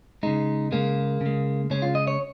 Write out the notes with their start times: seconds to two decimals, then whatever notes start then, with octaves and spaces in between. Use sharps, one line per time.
0.23 C#3 G#3 D#4
0.72 C#3 G#3 A#3
1.21 C#3 G#3
1.70 C#3 G#3 C#4
1.82 F4
1.95 D#5
2.07 C#5